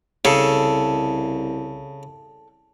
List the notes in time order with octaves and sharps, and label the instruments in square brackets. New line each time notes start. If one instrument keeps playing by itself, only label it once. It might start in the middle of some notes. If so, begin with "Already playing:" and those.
[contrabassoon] C2 [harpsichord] C#3 [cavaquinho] A4